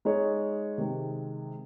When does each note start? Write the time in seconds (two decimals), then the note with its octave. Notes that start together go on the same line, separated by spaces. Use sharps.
0.05 G#3 D#4 G#4 C#5
0.78 C3 D#3 G#3